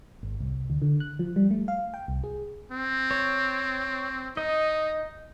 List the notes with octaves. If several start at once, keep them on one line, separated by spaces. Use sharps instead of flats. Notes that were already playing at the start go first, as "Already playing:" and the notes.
G#1
C2
D2
D3
F#6
F3
G3
A3
F5
G5
C2
G#4
C4
C#5
D#4 D#5